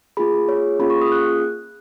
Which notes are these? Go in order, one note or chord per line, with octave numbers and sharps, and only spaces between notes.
A#3 F4 G#4 B5
C#5
A#3 C#4 F4 G#4 B5
C#6
D#6
F#6